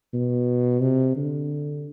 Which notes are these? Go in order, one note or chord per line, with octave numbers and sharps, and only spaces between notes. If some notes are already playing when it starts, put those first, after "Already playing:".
B2
C3
D3